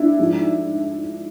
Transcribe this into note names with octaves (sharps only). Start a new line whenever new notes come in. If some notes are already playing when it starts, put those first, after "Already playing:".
Already playing: D4 E4
G#2 F3